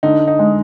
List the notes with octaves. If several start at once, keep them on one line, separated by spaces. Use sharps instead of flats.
D3 D#4
D#4
G#3